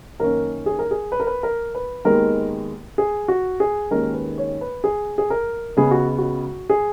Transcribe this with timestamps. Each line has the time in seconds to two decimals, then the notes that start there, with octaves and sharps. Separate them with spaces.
0.19 F#2 D#3 A#3 C#4 A#4
0.66 G#4
0.79 A#4
0.91 G#4
1.12 B4
1.20 A#4
1.27 B4
1.43 A#4
1.75 B4
2.05 D#2 D#3 G#3 B3 A#4
2.98 G#4
3.28 F#4
3.60 G#4
3.91 D#2 D#3 G#3 C#4 A#4
4.14 B4
4.38 C#5
4.61 B4
4.84 G#4
5.18 G#4
5.30 A#4
5.77 C#2 C#3 G#3 B3 G#4
5.91 F#4
6.18 F#4
6.70 G#4